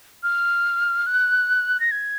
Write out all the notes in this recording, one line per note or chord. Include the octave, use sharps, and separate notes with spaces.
F6
F#6
A#6
G#6